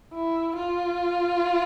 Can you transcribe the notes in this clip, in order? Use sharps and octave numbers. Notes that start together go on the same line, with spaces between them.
E4
F4